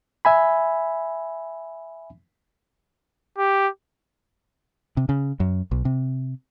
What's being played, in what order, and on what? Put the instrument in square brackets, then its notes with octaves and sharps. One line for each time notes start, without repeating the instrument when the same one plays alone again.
[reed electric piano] E5 G#5 B5
[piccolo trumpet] G4
[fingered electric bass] C3
C#3
F#2
B1
C3